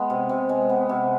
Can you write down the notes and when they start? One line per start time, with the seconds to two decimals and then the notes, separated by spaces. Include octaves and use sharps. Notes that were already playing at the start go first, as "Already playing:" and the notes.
Already playing: G#3 B3
0.10 C3
0.29 C3
0.49 G#3
0.69 B3
0.89 C3